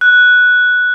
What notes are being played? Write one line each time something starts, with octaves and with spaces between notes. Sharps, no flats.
F#6